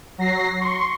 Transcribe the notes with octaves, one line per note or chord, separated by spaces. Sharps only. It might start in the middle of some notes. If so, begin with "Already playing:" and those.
F#3 A#6 C7
C6 C#6